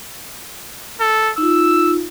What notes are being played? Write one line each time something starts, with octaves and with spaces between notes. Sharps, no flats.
A4
D#4 F4 E6